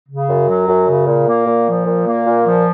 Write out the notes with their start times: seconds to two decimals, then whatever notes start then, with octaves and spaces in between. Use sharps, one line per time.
0.09 C#3
0.29 F#2
0.48 F#3
0.68 F#2
0.88 C#3
1.07 A#2
1.27 A#3
1.47 A#2
1.67 F3
1.87 A#2
2.06 A#3
2.26 A#2
2.46 F3